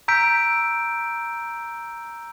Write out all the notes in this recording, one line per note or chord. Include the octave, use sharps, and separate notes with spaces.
A#5 E6 G6 B6 D7